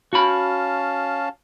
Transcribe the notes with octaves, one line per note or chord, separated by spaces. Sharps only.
C#4 F#4 F5 A5 B5